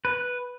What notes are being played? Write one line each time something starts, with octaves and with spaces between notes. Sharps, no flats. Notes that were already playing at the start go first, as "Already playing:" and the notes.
B4